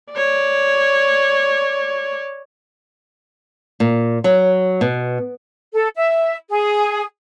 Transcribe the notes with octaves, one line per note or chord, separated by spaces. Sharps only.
C#5 D5
A#2
F#3
B2
A4
E5
G#4